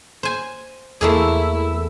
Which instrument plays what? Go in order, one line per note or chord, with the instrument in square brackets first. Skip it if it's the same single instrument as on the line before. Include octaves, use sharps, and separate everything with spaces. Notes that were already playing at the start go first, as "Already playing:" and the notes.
[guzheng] C5 G#5
[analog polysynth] E2 E6 [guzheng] A3 A#3 G#4 [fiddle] E4